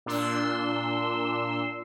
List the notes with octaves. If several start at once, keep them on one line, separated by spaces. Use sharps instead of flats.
A#2 D4 C6 E6